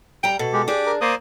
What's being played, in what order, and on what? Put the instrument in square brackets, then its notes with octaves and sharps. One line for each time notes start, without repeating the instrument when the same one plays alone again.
[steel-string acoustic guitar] G3 A#5 [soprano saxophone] G5
[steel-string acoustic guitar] B2 [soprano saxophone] A4
[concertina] G#3 G4
[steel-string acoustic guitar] D4 G#4 [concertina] G4 D6
[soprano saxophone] A#4
[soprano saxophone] A#3 [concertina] C5 D5 D#6